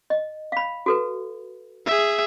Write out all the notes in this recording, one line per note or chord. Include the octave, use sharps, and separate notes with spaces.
D#5
F5 B5
F#4 A4 B4
G#4 E5